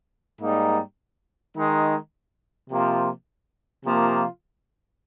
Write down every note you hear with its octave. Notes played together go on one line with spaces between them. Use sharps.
G#2 G3 A#3 D#4
D#3 G#3 D#4
C3 F3 A#3 F4
C3 F3 A#3 F4